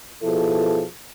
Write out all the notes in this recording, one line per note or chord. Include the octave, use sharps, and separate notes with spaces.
B2 F3 E4 G#4 A4